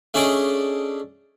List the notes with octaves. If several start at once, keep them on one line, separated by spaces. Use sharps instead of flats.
A3 C#4 D4 G#4 D5 D#5